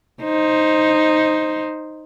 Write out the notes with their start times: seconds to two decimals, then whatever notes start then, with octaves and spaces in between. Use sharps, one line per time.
0.23 D#4 C5